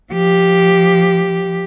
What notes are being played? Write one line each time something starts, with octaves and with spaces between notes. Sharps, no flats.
F3 G4